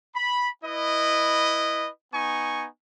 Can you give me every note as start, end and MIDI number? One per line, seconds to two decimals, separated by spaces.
0.14 0.48 83
0.63 1.88 64
0.63 1.88 71
0.63 1.88 75
2.13 2.66 59
2.13 2.66 63
2.13 2.66 80
2.13 2.66 85